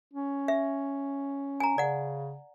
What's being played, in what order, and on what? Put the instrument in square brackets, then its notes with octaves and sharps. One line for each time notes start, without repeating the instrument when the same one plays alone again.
[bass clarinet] C#4
[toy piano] E5
G#5 A#5
[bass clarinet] C#3 [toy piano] D5 F#5